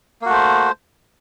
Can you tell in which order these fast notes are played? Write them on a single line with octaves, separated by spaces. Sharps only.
A#3 F#4 A3 C5